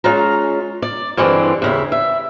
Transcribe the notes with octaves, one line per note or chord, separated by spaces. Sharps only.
G#3 C#4 F4 A#5
D5
G2 D3 E3 G#3 C4 D4
D#2 C#3 E4
E5